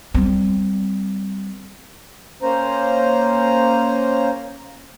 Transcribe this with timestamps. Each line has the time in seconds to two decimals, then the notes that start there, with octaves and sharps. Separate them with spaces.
0.14 G3 C4
2.42 A#3 C#4 C5 A#5